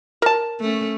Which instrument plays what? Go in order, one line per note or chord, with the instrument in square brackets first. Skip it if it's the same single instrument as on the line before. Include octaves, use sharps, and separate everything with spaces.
[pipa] A#4 A5
[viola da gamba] A3 C#4